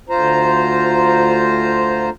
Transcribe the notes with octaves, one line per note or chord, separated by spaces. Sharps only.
D2 F4 C5 A#5